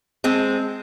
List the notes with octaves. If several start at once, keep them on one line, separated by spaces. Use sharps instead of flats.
G#3 C4